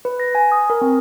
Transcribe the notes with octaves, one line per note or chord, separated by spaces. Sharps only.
B4
A#6
G#5
D#6
A#4
C4